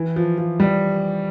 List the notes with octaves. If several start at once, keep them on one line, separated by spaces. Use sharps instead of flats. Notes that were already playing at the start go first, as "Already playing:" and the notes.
Already playing: E3
F3
F3
G3